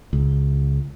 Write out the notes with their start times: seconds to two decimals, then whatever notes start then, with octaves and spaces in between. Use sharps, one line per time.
0.13 C#2